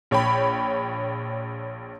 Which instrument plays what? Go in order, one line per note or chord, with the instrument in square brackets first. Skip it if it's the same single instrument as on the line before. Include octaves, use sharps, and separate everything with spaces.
[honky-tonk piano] A#1 C#5 G5 B5